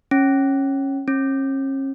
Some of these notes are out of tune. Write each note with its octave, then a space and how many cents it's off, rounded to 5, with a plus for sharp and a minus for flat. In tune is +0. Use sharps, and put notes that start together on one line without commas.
C#4 -15
C#4 -40